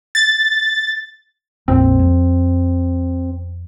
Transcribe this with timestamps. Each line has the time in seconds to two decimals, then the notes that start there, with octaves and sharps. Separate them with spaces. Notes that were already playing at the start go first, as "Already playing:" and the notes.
0.15 A6
1.68 A#1 F2 A#3 C4
1.99 F2